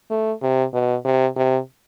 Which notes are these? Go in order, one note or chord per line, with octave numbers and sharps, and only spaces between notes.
A3
C3
B2
C3
C3